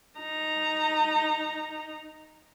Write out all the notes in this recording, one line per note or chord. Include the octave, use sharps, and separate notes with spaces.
D#4 A#5